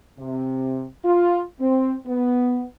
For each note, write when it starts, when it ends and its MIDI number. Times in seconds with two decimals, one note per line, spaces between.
0.19 0.84 48
1.05 1.42 65
1.61 1.94 60
2.07 2.63 59